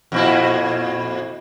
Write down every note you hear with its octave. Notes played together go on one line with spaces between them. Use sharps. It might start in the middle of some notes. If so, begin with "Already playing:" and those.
F2 A#2 E4